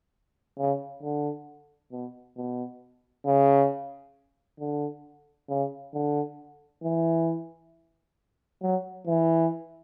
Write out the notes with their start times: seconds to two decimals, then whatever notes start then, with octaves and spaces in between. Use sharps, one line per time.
0.58 C#3
1.03 D3
1.92 B2
2.37 B2
3.26 C#3
4.60 D3
5.49 C#3
5.94 D3
6.83 E3
8.62 F#3
9.07 E3